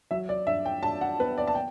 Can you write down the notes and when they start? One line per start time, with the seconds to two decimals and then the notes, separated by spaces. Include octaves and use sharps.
0.11 F#3 E5
0.29 D5
0.46 G2 E5
0.65 G5
0.83 G2 A5
1.01 F#5
1.19 B3 B4
1.38 D5
1.47 A5
1.55 G5